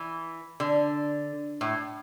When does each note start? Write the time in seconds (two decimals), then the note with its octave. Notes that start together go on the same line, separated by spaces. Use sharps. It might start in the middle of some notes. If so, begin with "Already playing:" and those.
Already playing: E3
0.60 D3
1.61 A2